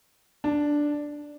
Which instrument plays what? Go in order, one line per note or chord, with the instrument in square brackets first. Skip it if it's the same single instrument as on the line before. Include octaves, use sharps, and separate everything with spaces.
[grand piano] D4